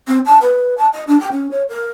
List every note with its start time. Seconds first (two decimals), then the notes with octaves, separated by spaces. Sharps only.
0.08 C4
0.26 A5
0.41 B4
0.78 A5
0.93 D#5
1.07 D4
1.20 G5
1.32 C#4
1.51 C#5
1.69 A#4